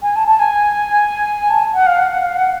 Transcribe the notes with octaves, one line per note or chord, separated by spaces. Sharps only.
G#5
A5
A5
G#5
A5
F#5
F5
F#5
F#5
F5
F#5